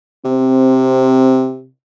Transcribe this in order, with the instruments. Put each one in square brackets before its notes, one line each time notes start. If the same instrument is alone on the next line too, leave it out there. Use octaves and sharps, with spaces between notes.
[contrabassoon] C3 [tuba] C4